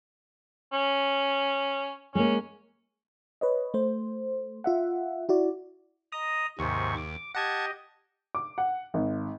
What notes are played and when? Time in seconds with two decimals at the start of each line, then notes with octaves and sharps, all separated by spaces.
0.73 C#4
2.15 G#3 A#3 C#4
3.41 B4 C#5 D#5
3.74 A3 C5
4.64 F4 E5 F#5
5.29 E4 F#4 D5
6.12 D#5 A#5 D#6
6.59 D#2 G#2 C3 C#6
6.97 D6
7.35 G4 D#5 F#5 A5 G#6
8.35 D6
8.58 F#5
8.94 G#1